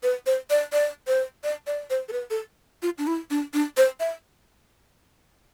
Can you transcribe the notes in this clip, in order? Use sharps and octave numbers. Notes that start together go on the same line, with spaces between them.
B4
C5
D5
D5
C5
D5
D5
C5
A4
B4
A4
F4
D4
E4
D4
D4
C5
E5